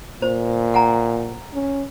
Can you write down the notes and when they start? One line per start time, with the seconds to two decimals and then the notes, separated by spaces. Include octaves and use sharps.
0.22 A#2 C5
0.74 F#5 G#5 A#5
1.54 C#4